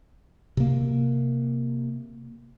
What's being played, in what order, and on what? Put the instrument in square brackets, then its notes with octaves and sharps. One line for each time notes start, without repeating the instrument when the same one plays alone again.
[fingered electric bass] C3 A#3